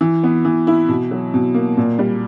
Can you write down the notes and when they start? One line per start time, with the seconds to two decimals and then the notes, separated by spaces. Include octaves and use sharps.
0.01 E3
0.23 B3
0.45 E3
0.67 E4
0.89 B2
1.11 F#3
1.34 B2
1.54 A#3
1.77 A#2
1.99 G3